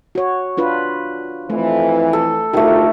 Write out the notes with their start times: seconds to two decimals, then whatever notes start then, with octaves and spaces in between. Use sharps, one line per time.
0.15 F#4 C#5
0.57 D4 F4 B4
1.50 F2 E3 A3
2.13 A4
2.53 D2 D#3 A3 F4 G4 A#4